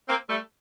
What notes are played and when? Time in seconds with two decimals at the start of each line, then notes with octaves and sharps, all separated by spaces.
0.08 A#3 C4
0.30 G3 A3